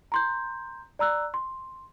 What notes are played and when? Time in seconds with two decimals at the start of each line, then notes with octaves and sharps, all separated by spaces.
0.12 A#5 C6 G6
0.99 D5 A#5 E6 F#6
1.34 C6